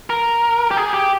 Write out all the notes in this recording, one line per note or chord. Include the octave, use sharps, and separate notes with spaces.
A#4
G4
G#4
G4